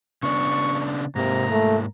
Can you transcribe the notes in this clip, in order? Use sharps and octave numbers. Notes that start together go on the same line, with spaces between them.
C#3 B3 D4 C#6
G#2 C3 A#3 A#5
A3